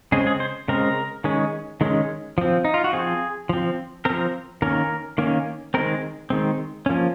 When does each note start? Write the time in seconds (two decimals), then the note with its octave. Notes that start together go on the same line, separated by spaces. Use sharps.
0.12 C#3 G#3 C4 G#4
0.27 G#4
0.40 C5
0.68 C#3 G#3 C4 A#4
1.24 D#3 G#3 C#4
1.81 D#3 G#3 C#4
2.38 F3 C4
2.65 D#4
2.74 F4
2.84 F#4
2.93 F3 C4 G#4
3.49 F3 C4
4.05 F3 C4 A#4
4.62 D#3 A#3 C#4 A#4
5.18 D#3 A#3 C#4
5.74 D#3 G#3 C4 A#4
6.30 D#3 G#3 C4
6.86 F3 A#3 C#4